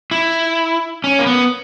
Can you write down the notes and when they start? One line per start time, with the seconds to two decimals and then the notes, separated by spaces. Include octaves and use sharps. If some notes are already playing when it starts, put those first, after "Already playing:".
0.11 E4
1.04 C#4
1.19 A#3
1.27 B3